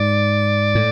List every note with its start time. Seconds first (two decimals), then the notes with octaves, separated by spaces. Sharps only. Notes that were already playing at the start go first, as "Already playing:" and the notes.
Already playing: G#2 D5
0.75 A2